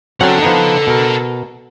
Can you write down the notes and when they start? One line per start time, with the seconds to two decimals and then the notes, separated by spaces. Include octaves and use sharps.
0.21 F#3 C4 C#4 A4 F#5
0.42 F3 B3 D#4
0.87 B2 A#4